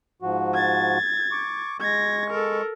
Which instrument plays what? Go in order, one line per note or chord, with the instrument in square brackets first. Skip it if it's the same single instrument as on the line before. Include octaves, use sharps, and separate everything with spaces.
[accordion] G#2 F3 F#4
[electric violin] G#6 A6
[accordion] C#6 D6
[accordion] G#3 C#6 [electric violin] G#6 A#6
[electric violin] A4 A#4